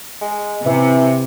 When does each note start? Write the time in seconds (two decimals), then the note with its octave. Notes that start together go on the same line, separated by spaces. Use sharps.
0.21 G#3
0.66 C3 E3